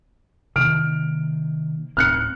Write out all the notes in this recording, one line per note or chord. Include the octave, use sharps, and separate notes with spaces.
C3 D#3 A#3 F6 D7
D1 A2 C4 F6 F#6 C#7